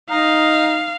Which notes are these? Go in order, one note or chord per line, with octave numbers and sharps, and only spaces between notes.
D#4 F5